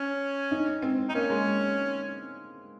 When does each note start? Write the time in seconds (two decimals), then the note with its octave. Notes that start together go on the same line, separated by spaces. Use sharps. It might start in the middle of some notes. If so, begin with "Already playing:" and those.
Already playing: C#4
0.51 D#4
0.82 C4
1.09 D#4
1.14 A#3 C#4
1.30 G#3